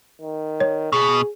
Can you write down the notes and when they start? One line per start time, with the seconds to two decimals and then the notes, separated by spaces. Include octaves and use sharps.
0.21 D#3
0.60 C#5
0.93 B2 G#4